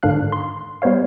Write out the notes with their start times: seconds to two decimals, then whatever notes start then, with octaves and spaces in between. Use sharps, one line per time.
0.03 G#2 D3 D#3 D4 F5 F#6
0.32 C6
0.82 G3 B3 C5 C#5 F5